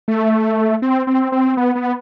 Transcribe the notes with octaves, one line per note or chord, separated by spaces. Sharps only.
A3
C4
C4
C4
B3
B3